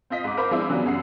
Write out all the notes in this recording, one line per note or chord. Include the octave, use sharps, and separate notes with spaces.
C4 F4 D#5 B6
G#2 D6
A#4 C5 F5 B5 D6
F3 G#3 C4 D4 E4 F4
C#3 E3 F#3 G3 B3 D4
F#2 G#4 F#5 E6 C7